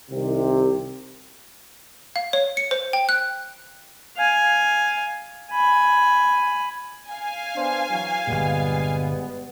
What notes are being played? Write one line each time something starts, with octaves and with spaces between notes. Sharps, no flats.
C2 C3 D#3
F5
C#5
C#7
C5
G5
F#6
F5 G#5
G#5 B5
F5 G#5
B3 D4 C5
E3 F#3
G1 A#2 G3 G#3 B3